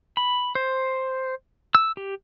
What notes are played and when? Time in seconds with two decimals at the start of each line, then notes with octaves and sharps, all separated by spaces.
0.17 B5
0.55 C5
1.75 E6
1.97 G4